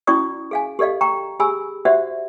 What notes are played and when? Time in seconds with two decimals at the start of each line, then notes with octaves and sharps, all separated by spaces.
0.07 C#4 E4 F#4 D5 C#6 D#6
0.51 G#4 F5 G#5
0.79 G4 A4 D5 D#5 F5
1.01 G5 A#5 C#6
1.40 G4 G#4 G#5 B5 E6
1.85 F#4 G4 C5 D5 E5 F#5